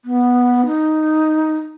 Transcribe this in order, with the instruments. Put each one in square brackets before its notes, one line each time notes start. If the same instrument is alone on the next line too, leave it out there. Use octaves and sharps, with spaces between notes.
[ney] B3
D#4